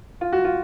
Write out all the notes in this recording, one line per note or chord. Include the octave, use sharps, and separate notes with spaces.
F4
F#4
F4